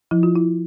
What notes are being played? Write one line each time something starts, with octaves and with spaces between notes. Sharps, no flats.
F3 E4
F4
E4